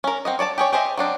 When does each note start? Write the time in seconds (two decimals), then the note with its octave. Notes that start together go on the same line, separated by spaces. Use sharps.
0.04 C#4 A#4
0.25 C4 F#4 D#5
0.39 C#5 D5 G#5 A5
0.58 G4 G#4 C#5
0.73 G4 G#4 C5 D#5 E5
0.97 F#3 C4 D4 D#5